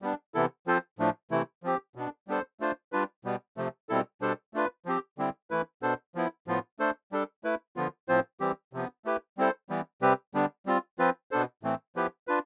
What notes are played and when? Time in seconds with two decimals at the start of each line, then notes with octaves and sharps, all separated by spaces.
0.02 G3 B3 D4
0.34 C3 E3 B3 E4 A4
0.67 F3 C4 F4 A4 C5
0.99 A2 F3 A3 D4
1.31 C3 E3 A3 E4
1.63 F3 C4 G4
1.95 B2 B3 D4
2.28 G3 B3 D4 A4 C5
2.60 A3 D4 F4 C5
2.92 G3 D4 F4 B4
3.25 B2 G3 B3
3.57 C3 F3 A3
3.89 B2 G3 C4 E4 A4
4.21 B2 G3 D4 A4 C5
4.54 A3 D4 F4 B4
4.85 F3 C4 G4
5.18 D3 G3 C4 E4
5.50 E3 A3 E4 B4
5.82 B2 B3 D4 A4 C5
6.15 F3 B3 E4
6.47 A2 F3 B3 F4
6.79 A3 D4 A4 C5
7.12 G3 D4 A4
7.44 A3 E4 B4
7.76 D3 F3 B3 F4
8.09 A2 F3 C4 F4 C5
8.40 E3 G3 C4 G4
8.73 C3 F3 B3
9.05 A3 E4 G4 B4
9.38 G3 C4 E4 A4 C5
9.69 E3 G3 B3
10.02 C3 G3 C4 G4 B4
10.34 D3 G3 B3 D4
10.66 G3 C4 F4
10.99 F3 C4 F4 B4
11.31 B2 B3 D4 A4 C5
11.63 A2 E3 A3 C4
11.96 F3 B3 E4 G4 B4
12.27 D4 F4 B4